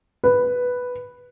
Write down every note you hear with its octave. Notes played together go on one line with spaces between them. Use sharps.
B4